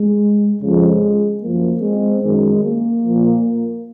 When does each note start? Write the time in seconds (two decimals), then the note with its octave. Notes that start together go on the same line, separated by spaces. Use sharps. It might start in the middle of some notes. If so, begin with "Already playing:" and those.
Already playing: G#3
0.60 F2 C#3 F3 G#3
1.41 F#2 F3 A#3
1.81 G#3 C4
2.21 F#2 D#3 G#3
2.62 A#3
3.03 A#2 F3